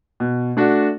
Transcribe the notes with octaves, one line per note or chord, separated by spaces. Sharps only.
B2
A3 D4 F#4